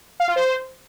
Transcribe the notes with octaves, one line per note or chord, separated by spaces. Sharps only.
F5
F4
C5